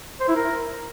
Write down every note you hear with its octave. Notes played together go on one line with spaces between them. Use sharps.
C5
E4
A#4